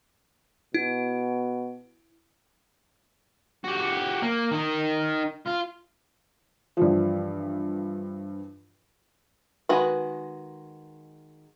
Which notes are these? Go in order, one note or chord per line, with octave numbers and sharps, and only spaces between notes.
B2 E4
F#4 G4
A#3
D#3 D#4
F4
G2 E3 F3
D#3 G#3 F#4 B4